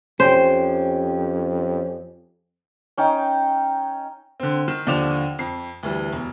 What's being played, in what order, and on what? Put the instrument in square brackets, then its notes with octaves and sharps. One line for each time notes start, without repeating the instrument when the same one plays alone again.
[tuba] F2 [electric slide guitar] C#4 G4 [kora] C5
[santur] C#4 D#4 G5
[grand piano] D3 C4
D#3 E7
D#2 D3 F3 D5 E7 F7
F2 C7
D2 E3 G3
E1